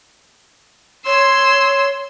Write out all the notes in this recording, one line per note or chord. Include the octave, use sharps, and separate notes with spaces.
C#5 C6 E6